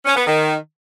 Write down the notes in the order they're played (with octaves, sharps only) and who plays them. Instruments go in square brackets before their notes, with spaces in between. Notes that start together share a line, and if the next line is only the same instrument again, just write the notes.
[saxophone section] C#4
B3
D#3